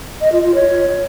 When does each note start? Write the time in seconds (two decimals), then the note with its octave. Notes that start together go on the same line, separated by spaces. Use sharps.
0.21 D#5
0.32 F4
0.43 F4
0.55 C#5